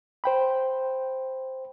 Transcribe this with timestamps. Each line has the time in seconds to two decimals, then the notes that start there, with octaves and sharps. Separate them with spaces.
0.24 C5 G5 B5